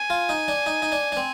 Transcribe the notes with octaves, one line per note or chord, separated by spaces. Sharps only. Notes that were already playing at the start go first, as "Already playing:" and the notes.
Already playing: G#5
F4
D#4
D4
D#4
D#4
D4
D4
C4